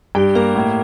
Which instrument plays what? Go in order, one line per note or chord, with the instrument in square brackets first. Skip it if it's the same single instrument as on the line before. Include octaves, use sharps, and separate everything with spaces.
[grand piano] G2 [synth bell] G4
[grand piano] A#3 [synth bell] A#4
[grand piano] A2